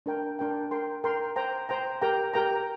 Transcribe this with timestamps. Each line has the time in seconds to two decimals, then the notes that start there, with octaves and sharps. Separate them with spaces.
0.06 D4 A#4 G5
0.39 D4 A#4 G5
0.71 A#4 G5 C6
1.04 A#4 G5 C6
1.36 C5 G5 A#5
1.69 C5 G5 A#5
2.02 G4 A#4 G5 A#5
2.34 G4 A#4 G5 A#5